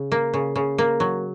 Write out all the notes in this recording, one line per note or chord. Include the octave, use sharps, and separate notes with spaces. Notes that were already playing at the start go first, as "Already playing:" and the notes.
Already playing: C#3
A#3
C#3
C#3
A#3
F#3